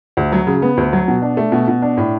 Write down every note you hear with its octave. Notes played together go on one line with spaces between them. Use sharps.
D2
F#3
C#3
B3
D2
F#3
B2
D4
A3
B2
B2
D4
A2